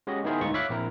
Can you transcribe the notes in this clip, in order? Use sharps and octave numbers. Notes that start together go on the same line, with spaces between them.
G#3 C#4 F#4 G4 D#5
D#3 B3 E4 G#4 A#4 C5
D2 G#2 D#4 F4 C#6
C#5 E5 F5 B5 D6 F#6
A#1 C4 E4 A#4